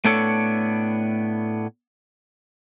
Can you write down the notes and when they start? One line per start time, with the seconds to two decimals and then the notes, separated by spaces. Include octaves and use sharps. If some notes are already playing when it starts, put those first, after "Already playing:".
0.05 A2 A3 B3 D4 A4 C#5